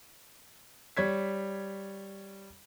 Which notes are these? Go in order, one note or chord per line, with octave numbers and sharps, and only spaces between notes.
G3 C#5 G#6 B6